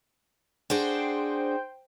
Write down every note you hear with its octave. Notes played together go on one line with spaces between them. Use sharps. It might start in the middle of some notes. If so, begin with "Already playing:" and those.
D4 F#4 G#4 C5 G5